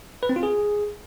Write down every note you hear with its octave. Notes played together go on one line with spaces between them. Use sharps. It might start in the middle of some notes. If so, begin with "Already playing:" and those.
B4
C4
F4
G#4